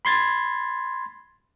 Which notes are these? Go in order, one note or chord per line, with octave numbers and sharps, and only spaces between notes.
B5 C6 G#6 A6